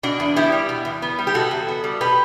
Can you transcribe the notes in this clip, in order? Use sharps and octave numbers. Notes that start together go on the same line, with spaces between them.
B2 D4 F#4
E2
B3 E4 G4
G3
B2
E2
B3
G3
G4
B2 F#4 A4
E2
B3
G3
B2 G4 B4